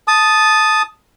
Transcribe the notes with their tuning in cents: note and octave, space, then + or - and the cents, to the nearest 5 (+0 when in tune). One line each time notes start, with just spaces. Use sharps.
A5 -10 D#6 +0